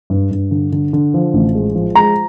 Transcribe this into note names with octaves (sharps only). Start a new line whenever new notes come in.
G2
G2
D3
D3
D3
F3
A1
G#3
F3
G#3 A#5